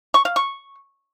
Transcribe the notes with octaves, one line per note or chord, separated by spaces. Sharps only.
C#6
F5
C#6